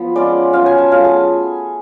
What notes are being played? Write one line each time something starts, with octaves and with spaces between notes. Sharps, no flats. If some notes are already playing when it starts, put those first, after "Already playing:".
Already playing: F3 B3
G#3 C#4 F4 D5
F#3 C#4 F4 F5
G#5
A5
F#3 A3 F4 F5
G#4